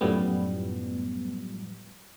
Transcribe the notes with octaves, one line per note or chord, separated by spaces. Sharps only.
F#2 A2 F3 G3 B3